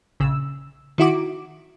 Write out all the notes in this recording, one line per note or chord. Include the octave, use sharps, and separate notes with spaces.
A#1 C#3 E6
D#3 E4 F#4 D6